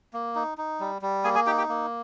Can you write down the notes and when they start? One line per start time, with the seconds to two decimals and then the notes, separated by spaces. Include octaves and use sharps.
0.13 A#3
0.35 D#4
0.58 D#4
0.80 G3
1.02 G3
1.24 A#3 G#4 G#5
1.35 G#4 G#5
1.46 D#4 G4 G5
1.58 G4 G5
1.69 A#3